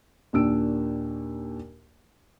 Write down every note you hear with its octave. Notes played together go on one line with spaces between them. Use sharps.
D#2 A#2 D4 E6 D7